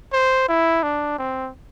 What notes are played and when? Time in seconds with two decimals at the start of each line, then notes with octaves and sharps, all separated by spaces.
0.13 C5
0.48 E4
0.83 D4
1.19 C4